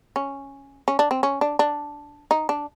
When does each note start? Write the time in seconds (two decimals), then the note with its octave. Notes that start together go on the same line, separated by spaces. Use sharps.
0.16 C#4
0.88 C#4
0.99 D4
1.11 C4
1.23 C#4
1.41 D4
1.59 D4
2.31 D#4
2.49 D4